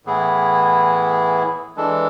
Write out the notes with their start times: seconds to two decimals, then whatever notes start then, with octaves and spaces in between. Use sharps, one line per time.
0.05 A2 E3 B3 E4 G#4
1.77 E3 G#3 D4 A4